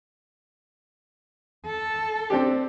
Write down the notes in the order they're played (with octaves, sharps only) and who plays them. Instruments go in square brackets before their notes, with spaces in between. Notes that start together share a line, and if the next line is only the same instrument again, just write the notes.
[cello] A4
[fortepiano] C4 D4 G4